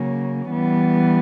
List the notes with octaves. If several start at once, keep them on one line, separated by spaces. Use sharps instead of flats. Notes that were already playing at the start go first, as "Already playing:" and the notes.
Already playing: C#3 F#3 A#3 C#4
E3 G3 B3